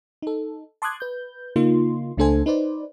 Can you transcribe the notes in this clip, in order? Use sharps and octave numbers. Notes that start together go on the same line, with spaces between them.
D#4 A4
A5 C6 D6 D#6 F#6 G#6
B4 G6
C#3 A#3 D#4 F4 C6
C#2 A3 D4 A4 C5 G#5
D#4 B4 C5 D5